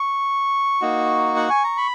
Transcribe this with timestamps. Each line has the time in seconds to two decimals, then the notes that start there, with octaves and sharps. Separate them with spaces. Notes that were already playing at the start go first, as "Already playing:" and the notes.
Already playing: C#6
0.81 A#3 D#4 F#4
1.36 F#5
1.50 G#5
1.64 A#5
1.78 B5